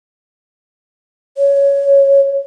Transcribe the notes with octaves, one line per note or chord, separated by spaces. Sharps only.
C#5